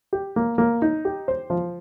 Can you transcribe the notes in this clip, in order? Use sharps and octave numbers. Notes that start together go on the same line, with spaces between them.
G4
A#3
A#3
D#4
G4
C5
F3